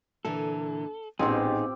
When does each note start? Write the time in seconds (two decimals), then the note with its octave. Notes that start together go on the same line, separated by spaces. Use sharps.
0.25 A#2 D3 E3 A4
1.19 A1 A#2 B3 C4 D#4 F4 G4 G#4